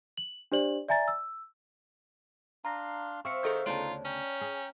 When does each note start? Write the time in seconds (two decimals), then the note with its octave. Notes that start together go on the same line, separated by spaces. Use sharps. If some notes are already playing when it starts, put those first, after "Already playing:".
0.17 F#7
0.52 D4 G4 C5 D5 F#7
0.88 D5 E5 G#5 A#5 A6
1.08 E6
2.65 D4 F5 A#5 C6 A#6
3.25 C4 E5 F5 C#6 C#7
3.43 D#3 G#4 A4 G6
3.66 D2 C#3 B3 D#4 F4 C#5 D5 A5
4.05 C#4 G5 A#5
4.41 G#4